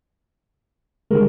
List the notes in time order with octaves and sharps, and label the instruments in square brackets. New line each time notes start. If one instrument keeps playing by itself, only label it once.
[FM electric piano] D3 G3 G#3 [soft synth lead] A#4